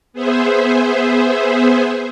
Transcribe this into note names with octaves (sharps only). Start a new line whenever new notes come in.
B3 G#4 C5 E5